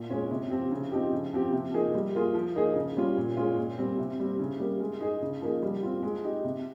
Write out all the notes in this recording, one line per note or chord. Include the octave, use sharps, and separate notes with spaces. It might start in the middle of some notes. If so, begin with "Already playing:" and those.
Already playing: A#2
G#3 C#4 F4
C3
F3 C4 G4
C#3
F3 C4 D#4 G4
C#3
F3 C4 G4
C3
F3 A#3 D#4 G#4
G3
A#3 F4 G#4
F3
A#3 D#4 G#4
C#3
G3 C#4 F4
A#2
G#3 C#4 F4
A#2
G3 C4
C3
G3 C4
C#3
G3 A#3
G#3
D#4 G#4
C#3
F3 A#3 D#4 G#4
G3
C4 F4
G#3
D#4 G4
C3